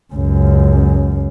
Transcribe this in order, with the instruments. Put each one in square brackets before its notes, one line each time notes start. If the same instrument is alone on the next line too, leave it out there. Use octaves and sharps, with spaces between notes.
[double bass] C#2 F#2